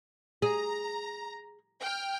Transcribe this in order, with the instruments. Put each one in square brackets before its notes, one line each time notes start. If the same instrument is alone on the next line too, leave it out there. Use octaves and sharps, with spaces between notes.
[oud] G#4 [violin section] A#5
[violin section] G5 F6